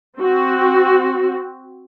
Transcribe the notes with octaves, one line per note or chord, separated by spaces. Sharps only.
C4 F#4